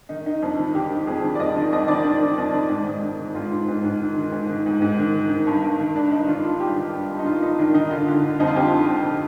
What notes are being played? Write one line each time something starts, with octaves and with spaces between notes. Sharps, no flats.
D#3 D#4
D#3 D#4
F2 D4
D#3
D#3 G4
D#3
F2 G#4
D#3
D5
F2 D#5
D#3
F2 D#5
D#3 D5
D#3
D#3
F2
D#3
G#2
G#2
D#3
D#3
G#2 F4
G#2
G#2
G#2
D#3
D#3
G#2
D#3
G#2
G#2
D#3
D#3
D#3
G2
G2
D#3
D#3 D4
G2 D#4
D#3 F4
D#3 F4
G2 G4
D#3
G2
G2
D#4
D#3 F4
D#3 D#4
D#3 D4
D#3 D#4
D3 F4
D3
D3
F2 D#4
F4
F2 G4
D3
F2
D3